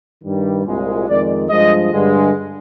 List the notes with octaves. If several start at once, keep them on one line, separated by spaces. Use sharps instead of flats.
G2 D#3 G3
C2 A#2 G#3
F2 D#3 G#3 D5
G2 F3 G#3 D#5
G2 D3 G#3